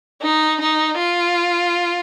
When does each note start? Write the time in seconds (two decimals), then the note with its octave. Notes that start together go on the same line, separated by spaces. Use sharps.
0.22 D#4
0.61 D#4
0.99 F4